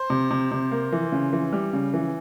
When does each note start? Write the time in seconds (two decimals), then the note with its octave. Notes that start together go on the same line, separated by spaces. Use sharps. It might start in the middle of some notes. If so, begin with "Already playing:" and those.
Already playing: C5
0.10 C3
0.31 C3
0.51 C3
0.71 A#3
0.92 E3
1.12 C#3
1.33 E3
1.53 G3
1.73 C#3
1.94 E3